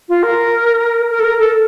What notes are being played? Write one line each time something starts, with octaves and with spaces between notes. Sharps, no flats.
F4
A#4
A#4
A4
A#4
A4